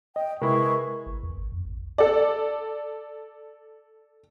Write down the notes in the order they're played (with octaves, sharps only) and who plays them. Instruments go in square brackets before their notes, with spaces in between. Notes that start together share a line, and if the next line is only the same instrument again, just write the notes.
[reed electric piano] D#5 [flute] G5
[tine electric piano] C3 [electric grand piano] G#3 E4 G#4 [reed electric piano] A#4 B4 [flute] C#6
[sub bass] G#1
E2
G#1
F2
A1
[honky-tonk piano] A4 D5